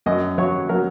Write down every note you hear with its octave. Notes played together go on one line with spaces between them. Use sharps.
F#2 D#5
F#3 C#5
F#3 A#4